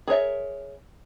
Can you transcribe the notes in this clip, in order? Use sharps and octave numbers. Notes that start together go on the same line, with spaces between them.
G#4 A#4 C#5 E5